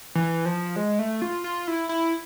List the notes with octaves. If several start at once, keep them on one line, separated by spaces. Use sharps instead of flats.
E3
F3
G#3
A3
F4
F4
E4
E4